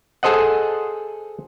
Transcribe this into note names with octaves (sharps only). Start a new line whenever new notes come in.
G#4 A4 C5 D#5 F#5